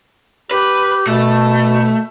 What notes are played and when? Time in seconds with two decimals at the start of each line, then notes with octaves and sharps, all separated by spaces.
0.51 G4 B4
1.07 B2 A3